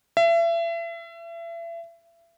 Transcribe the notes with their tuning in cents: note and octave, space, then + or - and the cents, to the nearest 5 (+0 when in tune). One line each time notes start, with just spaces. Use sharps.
E5 +35